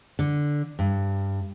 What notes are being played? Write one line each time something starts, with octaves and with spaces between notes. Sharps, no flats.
D3
G2